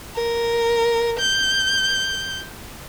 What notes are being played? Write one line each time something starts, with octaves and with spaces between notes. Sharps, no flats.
A#4
G6